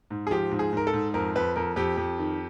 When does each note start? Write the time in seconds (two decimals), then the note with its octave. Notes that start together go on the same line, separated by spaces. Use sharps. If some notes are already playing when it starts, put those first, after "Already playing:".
0.11 G#2
0.27 G#4
0.31 F3 G4
0.51 G#2
0.59 G#4
0.73 G#2 A#4
0.87 A4
0.93 G#2
1.14 F2 A#4
1.35 F2 B4
1.56 F2 A#4
1.76 F2 G4
1.97 F2
2.19 D#3